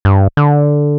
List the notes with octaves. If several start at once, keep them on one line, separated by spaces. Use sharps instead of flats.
G2
D3